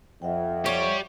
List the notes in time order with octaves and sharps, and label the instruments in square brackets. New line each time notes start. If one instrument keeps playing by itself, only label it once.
[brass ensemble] F2 [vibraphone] E5 F#5 G5
[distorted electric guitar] G4 D5 [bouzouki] C#5